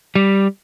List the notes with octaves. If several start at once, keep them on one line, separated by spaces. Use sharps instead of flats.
G3